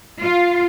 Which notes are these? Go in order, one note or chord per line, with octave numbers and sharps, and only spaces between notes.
F4